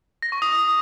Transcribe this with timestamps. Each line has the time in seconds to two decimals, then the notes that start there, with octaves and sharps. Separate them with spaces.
0.22 A#6
0.32 C#6
0.42 D#6